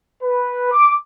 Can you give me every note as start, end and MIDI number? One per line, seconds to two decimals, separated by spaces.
0.21 0.68 71
0.72 0.93 86